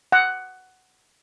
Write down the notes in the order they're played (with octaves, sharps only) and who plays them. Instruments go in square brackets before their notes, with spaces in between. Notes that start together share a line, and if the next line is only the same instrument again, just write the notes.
[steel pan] F#5